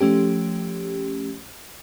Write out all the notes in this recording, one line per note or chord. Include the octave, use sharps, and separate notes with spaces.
F3 A3 C#4 G4